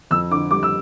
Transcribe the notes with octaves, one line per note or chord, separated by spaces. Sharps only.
F2 E6
D3 D6
G3 D6
E6